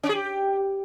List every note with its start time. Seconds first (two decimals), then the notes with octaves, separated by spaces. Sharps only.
0.03 C#4
0.09 G#4
0.15 G4